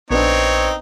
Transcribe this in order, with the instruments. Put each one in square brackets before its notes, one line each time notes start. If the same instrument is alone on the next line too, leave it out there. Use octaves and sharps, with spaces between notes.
[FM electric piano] A#1 [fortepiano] B3 D4 [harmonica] C4 D#4 [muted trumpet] C#5